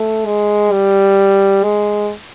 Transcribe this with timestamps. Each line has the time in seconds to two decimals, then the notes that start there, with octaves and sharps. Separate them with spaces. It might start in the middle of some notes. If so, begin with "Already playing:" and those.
Already playing: A3
0.26 G#3
0.72 G3
1.63 G#3